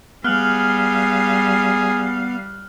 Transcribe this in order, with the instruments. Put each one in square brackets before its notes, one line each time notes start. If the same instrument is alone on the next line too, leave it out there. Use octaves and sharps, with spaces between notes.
[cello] G3 F5 [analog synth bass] B3 [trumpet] G#4 [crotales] F6 F#6 F#7